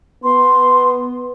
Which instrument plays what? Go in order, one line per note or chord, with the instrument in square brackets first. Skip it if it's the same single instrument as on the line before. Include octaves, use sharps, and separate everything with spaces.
[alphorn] B3 [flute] C6